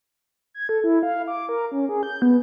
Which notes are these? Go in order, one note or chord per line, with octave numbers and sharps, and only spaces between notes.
G#6
A4
E4
F5
D6
A#4
C#4
G#4
G6
B3